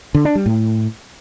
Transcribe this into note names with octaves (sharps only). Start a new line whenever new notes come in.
D3
D4
G3
A2